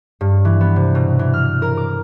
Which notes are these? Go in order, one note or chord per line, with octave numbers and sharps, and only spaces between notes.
G2
E3
B3
C3
B2
E3
F6
A#4
D6